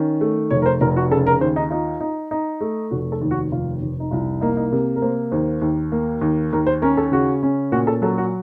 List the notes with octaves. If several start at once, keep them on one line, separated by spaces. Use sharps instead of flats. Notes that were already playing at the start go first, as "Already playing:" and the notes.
Already playing: D#3 C#4
A3
F1 C#5
A#4
C5
F1 A#4
F#4
C#3 A4
A#4
D#2 C5
D#4
D#4 F4
D#4
D#4
A3
F1 F#4
A4
D#2
F#4
F1 F4
F1
D#4
C2 F4
A#3 D#4
D#4
C3 A#4
A#4
A#3 C5
D#2 C5
D#2
A#3
D#2
D#2 A#4
C5
C#4 A#4
A4
C#3 F#4
C#4
A#2 F#4
A4
F#3 A4
F#4